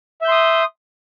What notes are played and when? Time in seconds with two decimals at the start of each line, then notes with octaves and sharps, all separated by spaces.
0.21 E5
0.25 G6
0.28 C6
0.32 D#6